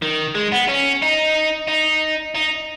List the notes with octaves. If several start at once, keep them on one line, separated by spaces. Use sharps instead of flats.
D#3
G#3
B3
C#4
D#4
D#4
D#4